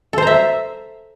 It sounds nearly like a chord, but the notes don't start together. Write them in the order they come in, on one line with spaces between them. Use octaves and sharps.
A4 C5 A#5 E5